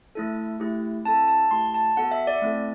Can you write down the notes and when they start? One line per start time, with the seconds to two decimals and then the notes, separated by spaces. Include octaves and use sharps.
0.15 A3 E4 A4
0.60 A3 E4 G4
1.05 C4 E4 A4 A5
1.28 A5
1.51 A3 E4 G4 C6
1.74 A5
1.97 B3 F#4 A4 F#5
2.11 E5
2.27 D5
2.42 A3 C4 E4 A4